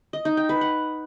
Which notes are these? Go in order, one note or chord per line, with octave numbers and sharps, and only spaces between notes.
D#5
D#4
G5
B4
F#5